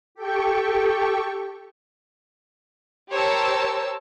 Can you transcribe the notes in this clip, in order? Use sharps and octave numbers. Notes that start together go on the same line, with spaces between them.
G4 A4 G5 C#6
G4 A#4 C5 C#5 A5 E6